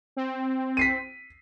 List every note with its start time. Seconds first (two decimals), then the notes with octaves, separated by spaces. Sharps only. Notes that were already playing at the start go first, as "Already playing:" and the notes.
0.16 C4
0.77 B6 C7 D#7